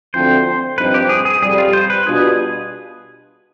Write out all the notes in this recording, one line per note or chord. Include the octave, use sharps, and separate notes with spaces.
D2 D3 F3 C4 C5
G2 F3 C4 D#4 B4
G4
G#4
G#4
F2 C3 G3 G#4
F4
C5
B4
B2 G3 D4 F4 G#4